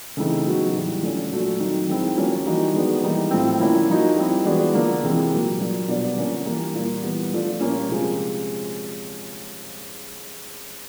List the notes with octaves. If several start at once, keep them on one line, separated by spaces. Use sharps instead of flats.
C#3 E3 A3 C4 D#4
C#3 F#3 B3 D#4 F#4
A2 E3 G3
D3 F3 A3 C#4
A#2 F#3 A3 D4 F#4
D#3 F#3 A3 C4 D#4
D#3 G#3 C4 E4
F3 A#3 C#4 F#4
E3 G3 A#3 D#4 F#4
D#3 G#3 B3 D4 F#4
E3 G3 A#3 D#4
A2 F3 A3 C4
D3 F3 A#3 C#4 E4
F3 A#3 D#4 F#4
G3 C4 E4
E3 G#3 B3 D4 F#4
D3 F3 A#3
C3 E3 G#3 C4
A#2 F#3 A#3
A#2 F#3 A#3 D4
B2 G3 B3 D4 F4
D3 F3 A#3 C#4
E3 G3 A#3
A#2 G3 A#3
E3 G3 B3
F3 A3 D4 F4
A#2 G3 A#3 C#4 F4
C3 F3 G#3 C#4